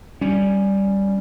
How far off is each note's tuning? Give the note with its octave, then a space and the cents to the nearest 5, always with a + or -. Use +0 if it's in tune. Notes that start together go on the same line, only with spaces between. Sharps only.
G3 +0 C#4 +0